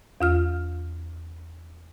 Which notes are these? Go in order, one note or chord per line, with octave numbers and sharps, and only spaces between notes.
E2 F4 F6